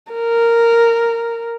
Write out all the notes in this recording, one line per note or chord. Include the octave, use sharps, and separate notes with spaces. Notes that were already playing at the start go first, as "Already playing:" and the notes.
A#4